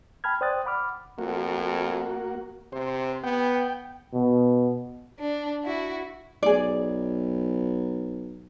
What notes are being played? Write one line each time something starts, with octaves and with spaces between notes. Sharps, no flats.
G5 A5 B5 F6 G#6
C5 D5 G5 D#6 F#6 A6
F#5 B5 D6 F6
F2 A#3 F#4
C3 C5
B3 G5
B2
D4
E4 F#4
B1 G#4 D5